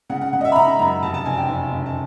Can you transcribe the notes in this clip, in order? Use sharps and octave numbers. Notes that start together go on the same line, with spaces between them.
C#3 F#5
F#5
C#3 F#5
D#5
E5
B5
C#3 A#5
F#2 A#5
F1 A5
A5
F1 G#5
G5
F1
C#3
A5